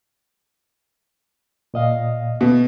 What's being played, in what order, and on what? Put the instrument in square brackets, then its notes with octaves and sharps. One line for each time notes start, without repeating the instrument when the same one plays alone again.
[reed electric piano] A#2 D#5 F5
[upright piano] B2